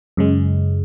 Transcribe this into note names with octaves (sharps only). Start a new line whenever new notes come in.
F#2 C#3 G#3